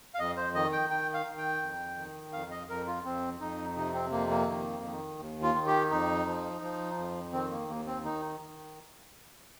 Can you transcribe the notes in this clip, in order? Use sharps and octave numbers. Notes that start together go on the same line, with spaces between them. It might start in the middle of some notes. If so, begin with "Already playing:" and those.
F5
F2 D#5
C5
D#3 D#5
G5
D#3 G5
F5
D#3
G5
F2
D#3
F2 F5
D#5
F2 A#4
F4
F2 C4
F2 D#4
C3 D#4
C4
F2 A#3
A#3
D#3
D#3
D#2
F4
D#3
G4
F2 D#4
F3
F3
F2
D#3 C4
A#3
D#2 A#3
C4
D#3 D#4
D#3